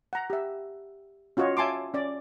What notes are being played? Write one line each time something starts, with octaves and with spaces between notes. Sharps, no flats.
F#5 A#5
G4 E5
C#4 F4 F#4 C#5 D#5
E5 G#5 A5 C6 D6
C#4 D5